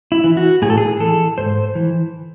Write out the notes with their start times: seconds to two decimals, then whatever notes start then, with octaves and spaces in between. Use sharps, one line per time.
0.12 E4
0.24 E3
0.37 F#4
0.62 A2 G#4
0.70 A4
0.78 G#4
1.00 E3 A4
1.38 G#2 C5
1.75 E3